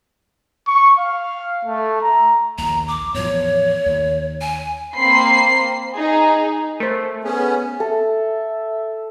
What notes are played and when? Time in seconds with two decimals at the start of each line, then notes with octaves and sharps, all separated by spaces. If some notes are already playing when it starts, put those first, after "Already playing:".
0.67 C#6
0.99 F5
1.65 A3
2.02 A#5
2.58 A#1 D#2 A#5
2.88 D6
3.14 E2 A2 F3 C#5
3.86 D#2
4.41 G#5
4.95 A#3 C4 B5 C6 C7
5.96 D#4 G#4
6.80 A3 A#4 C5
7.24 B3 C#4 G#4
7.80 A4 E5